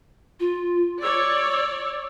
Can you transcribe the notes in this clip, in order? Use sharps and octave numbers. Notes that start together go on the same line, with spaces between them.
F4
C#5 D5 E6